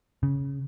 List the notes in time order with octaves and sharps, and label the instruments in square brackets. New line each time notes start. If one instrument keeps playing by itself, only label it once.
[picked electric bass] C#3